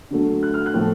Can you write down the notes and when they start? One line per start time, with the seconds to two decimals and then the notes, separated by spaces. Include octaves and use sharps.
0.11 D3 F#3 A3
0.43 F#6
0.54 F6
0.66 F#6
0.74 A2 F3 A3